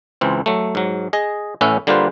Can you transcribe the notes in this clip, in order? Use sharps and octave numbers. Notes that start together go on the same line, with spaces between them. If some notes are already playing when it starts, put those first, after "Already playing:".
C#2 E3 C4
F#3 A3
G#2 F#3
G#4 D#5
A1 A2 C#4 B4 E5 F#5
D3 G3 A#3 F4 B4 C5